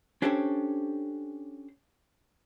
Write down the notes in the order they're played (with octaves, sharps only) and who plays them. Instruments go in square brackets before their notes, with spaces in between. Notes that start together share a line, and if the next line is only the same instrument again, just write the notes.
[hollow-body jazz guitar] C#4 D4 G4 A4 C5 C#5